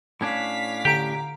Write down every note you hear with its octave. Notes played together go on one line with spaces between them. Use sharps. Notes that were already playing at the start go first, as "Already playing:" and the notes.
A2 C#4 D4 F5 B6
D3 G4 A#5 D7